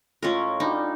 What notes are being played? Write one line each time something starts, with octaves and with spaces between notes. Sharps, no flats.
A2 G#3 C#4 F4 A#4
G3 D4 D#4 F#4